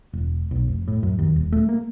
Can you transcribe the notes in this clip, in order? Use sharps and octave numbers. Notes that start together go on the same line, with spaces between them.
E1
B1
F1
A2
F#2
D#2
D#1
A3
A#3